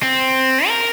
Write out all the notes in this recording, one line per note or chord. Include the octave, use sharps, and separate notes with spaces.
C4
A#4